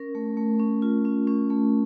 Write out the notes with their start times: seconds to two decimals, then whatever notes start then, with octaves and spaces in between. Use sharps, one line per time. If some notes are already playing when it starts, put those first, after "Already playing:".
Already playing: C#4 A#4
0.15 A3
0.37 A3
0.60 C#4
0.82 F4
1.05 C#4
1.27 C#4
1.50 A3